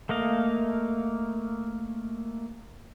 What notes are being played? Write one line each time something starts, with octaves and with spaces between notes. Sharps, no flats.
A3 A#3 D#5 F5